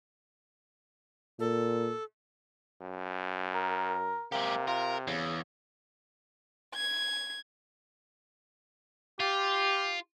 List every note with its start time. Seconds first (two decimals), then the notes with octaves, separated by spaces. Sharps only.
1.40 A#2 A4
2.81 F#2
3.54 A#4
4.32 C3 G#3 A#3 G4
4.68 F4 A#4
5.07 E2 C#3
6.75 G#6
9.20 F4 G4